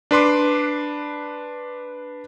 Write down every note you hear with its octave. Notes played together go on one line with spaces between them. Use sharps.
D4 B4 C6 D6